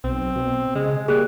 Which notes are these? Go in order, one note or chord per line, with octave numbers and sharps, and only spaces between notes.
B1 C4
B2
C#3 G#3
G3 A#3 G#4 F#6